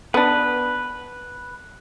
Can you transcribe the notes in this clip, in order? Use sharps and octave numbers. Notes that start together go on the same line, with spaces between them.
B3 D4 B4